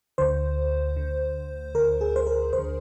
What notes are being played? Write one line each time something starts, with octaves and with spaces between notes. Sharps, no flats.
D2 D3 C5
D2 D3
D2 D3 A#4
G#4
C5
A#4
D2 C5
D3